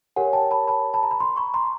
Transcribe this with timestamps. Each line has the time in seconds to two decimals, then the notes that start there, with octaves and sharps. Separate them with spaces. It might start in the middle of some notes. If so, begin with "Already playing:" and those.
0.16 G4 A#4 C#5 F#5 G#5
0.33 G5 A5
0.51 A5 B5
0.68 A5 B5
0.94 A5 B5
1.03 A#5
1.11 B5
1.20 A#5 C6
1.36 B5 C#6
1.54 A#5 C6